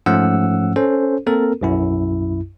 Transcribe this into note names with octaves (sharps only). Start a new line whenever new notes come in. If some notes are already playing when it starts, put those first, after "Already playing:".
G#2 F3 A3 C#4 F#5 E6
C#4 A4 C5
A#3 C4 A4 A#4
B1 F#2 E4